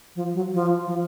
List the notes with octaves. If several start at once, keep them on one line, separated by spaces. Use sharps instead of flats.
F3
F#3
F3
F3